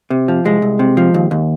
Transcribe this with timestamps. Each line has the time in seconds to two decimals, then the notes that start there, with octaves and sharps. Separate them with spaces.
0.10 C3
0.28 F3
0.45 C2 G#3
0.62 C2
0.79 C3
0.97 F3
1.14 D#2
1.31 D#2